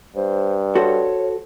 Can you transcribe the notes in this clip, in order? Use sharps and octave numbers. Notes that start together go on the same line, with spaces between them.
G2 C5
F#4 A4 C5 C#5